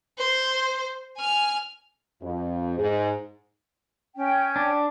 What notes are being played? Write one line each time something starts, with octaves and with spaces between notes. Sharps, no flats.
C5
G#5 F6
F2
G#2
C#4 G5
D4